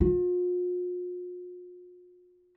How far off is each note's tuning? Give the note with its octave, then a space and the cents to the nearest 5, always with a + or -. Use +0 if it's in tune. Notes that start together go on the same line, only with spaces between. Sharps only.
F4 +45